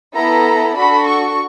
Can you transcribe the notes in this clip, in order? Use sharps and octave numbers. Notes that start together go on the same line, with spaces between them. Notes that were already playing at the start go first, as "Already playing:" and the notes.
B3 E4 A4 A#5
D4 F#4 A4 B5
C#6